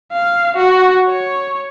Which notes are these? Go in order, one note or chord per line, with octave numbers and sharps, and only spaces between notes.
F5
F#4
C#5